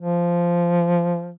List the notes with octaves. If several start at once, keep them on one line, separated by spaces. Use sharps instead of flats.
F3